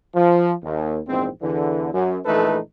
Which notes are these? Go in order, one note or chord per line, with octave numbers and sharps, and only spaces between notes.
F3
D#2
A#1 E2 G#2 C4
E2 D3 E3
F#2
A#1 E3 A3 D#4 A4 B4